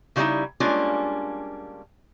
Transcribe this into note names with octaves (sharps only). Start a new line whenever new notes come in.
C#3 F3 G3 G#3 D#4 E4
G3 G#3 A#3 C#4 D4 F4